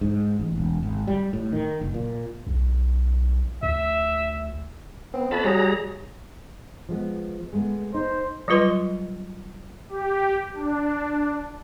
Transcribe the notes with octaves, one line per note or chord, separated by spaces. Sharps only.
G#2
A1
E1
G#1
G3
A2
D#3
F#1
A#2
B1
D2 E5
B3 C4
F2 A5 B5
F#3 G3 G#4 A#5
F3 G#3 B3
G#3 A3 B3
D#4 C5
F#3 G3 F4 B4 D#5 C6
G4
D4